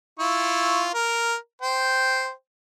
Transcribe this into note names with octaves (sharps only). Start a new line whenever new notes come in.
E4 F4 C#6
A#4
C5 G5